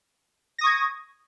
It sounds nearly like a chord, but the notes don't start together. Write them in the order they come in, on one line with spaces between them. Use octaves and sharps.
A#6 D#6 C#6 G#6